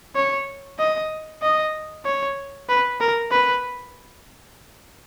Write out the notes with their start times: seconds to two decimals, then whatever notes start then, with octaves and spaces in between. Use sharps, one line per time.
0.16 C#5
0.79 D#5
1.43 D#5
2.05 C#5
2.69 B4
3.01 A#4
3.32 B4